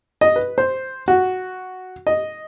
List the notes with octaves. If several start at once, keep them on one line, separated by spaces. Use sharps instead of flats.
D#5
B4
C5
F#4
D#5